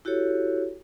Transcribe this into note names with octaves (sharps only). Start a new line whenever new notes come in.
E4 F#4 G4 A4 C#5